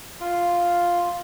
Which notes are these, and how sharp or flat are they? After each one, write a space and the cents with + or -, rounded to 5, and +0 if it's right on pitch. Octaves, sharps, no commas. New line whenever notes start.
F4 +0